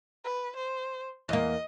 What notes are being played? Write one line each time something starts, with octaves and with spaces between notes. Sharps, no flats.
B4
C5
E2 A#3 D#5